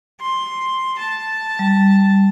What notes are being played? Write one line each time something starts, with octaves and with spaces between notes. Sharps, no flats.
C6
A5
G3